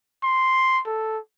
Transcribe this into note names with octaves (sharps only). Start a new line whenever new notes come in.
C6
A4